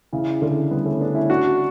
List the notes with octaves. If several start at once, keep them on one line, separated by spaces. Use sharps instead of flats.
C#3 E3
D3
G3 B3
A3 C#4
B3 D4
C#4 E4
D4 F#4